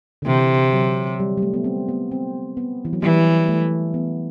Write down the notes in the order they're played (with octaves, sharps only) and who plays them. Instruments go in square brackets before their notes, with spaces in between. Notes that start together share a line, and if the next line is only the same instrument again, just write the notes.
[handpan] D3
[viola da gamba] C3 [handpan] E3
[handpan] F#3
G3
G3
A3
B3
C4
B3
C4
B3
E3
F#3
[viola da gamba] E3 [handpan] G3
[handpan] A3
B3